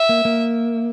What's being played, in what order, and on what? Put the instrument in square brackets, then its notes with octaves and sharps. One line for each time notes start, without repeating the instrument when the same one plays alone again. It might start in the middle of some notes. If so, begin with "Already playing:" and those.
Already playing: [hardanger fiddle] E5
[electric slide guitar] A#3
A#3